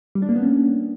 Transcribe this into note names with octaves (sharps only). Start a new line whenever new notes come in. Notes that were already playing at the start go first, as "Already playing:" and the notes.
G3
D4
A#3
B3
C#4